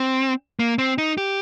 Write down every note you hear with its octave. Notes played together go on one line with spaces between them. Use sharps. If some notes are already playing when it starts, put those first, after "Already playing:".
Already playing: C4
A#3
C4
D#4
G4